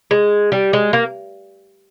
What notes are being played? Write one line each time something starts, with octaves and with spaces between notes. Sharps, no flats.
G#3
G3
G#3
A#3